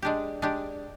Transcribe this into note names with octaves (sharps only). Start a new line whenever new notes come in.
G#3 D4 G4
G#3 D4 G4